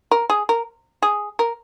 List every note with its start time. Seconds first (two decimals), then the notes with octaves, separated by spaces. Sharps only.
0.11 A#4
0.30 G#4
0.49 A#4
1.03 G#4
1.39 A#4